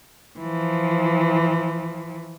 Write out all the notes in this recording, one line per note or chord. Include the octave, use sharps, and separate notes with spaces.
E3 F3